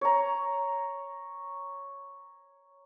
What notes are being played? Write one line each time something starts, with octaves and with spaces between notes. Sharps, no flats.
C#5 A#5